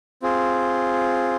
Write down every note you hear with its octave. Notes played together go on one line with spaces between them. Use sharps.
C4 F4 G#4